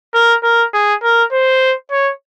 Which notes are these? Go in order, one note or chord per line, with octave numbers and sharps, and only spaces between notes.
A#4
A#4
G#4
A#4
C5
C#5